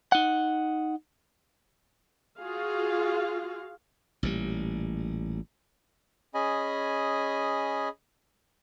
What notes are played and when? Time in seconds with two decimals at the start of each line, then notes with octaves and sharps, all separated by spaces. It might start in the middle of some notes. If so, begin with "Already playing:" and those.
0.12 D#4 F#5
2.39 F4 F#4 G#4 F5
4.23 A1 A#2 G3
6.34 C#4 G#4 D#5 G#5 B5